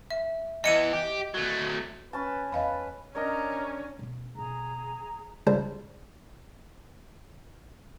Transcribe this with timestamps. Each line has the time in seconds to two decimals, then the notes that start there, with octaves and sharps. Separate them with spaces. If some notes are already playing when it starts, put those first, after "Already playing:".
0.11 E5
0.64 E2 E3 D#5 C#7 D#7
0.94 G4
1.35 F#3 A3
2.13 C#4 B4 A5
2.52 E2 B4 D#5 F5 B5
3.15 C#4 D4 A#4 C#5 D#5 G5 A#5
3.99 B2 C#4
4.35 B2 D3 G#4 A#5
5.47 G1 C#2 C#3 G3 C5 A5